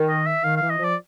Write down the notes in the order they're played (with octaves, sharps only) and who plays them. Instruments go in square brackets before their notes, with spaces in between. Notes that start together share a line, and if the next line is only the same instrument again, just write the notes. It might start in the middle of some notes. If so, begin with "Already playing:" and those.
Already playing: [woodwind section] D#3
[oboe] D#5
E5
[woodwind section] D#3 [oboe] F5
[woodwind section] E3 [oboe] F5
[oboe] D#5
[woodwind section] F3 [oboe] D5